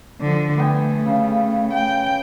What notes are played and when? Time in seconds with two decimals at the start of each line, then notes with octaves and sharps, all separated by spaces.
0.21 D3 F3
0.58 A3 B3 G5 G#5
1.06 C#3 F5
1.73 G5